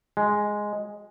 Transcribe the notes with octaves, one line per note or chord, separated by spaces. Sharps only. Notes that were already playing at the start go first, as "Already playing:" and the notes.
G#3